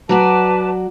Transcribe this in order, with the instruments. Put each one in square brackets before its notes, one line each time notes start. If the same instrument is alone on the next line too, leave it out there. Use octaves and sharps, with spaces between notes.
[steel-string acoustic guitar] F#3 F#4 D5 [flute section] B4 A5 D6